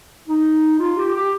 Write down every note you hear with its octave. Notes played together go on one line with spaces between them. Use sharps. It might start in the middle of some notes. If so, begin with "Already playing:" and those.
D#4
F4
G4
G4